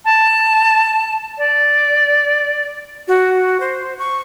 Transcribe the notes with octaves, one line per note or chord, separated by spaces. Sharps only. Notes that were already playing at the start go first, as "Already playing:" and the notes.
A5
D5
F#4
C5
C#6